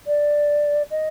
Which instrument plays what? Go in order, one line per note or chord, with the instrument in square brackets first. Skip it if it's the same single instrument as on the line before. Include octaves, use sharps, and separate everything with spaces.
[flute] D5
D#5